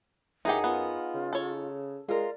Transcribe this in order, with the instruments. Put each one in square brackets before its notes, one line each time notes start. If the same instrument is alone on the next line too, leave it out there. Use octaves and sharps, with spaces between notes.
[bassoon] F#2 [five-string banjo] E3 G4 [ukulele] D#4 G#4 F#5
[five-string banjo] B3 [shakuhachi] F4
[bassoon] C#3
[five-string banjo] A4 C#5
[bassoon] G#3 [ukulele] F4 A#4 [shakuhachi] D5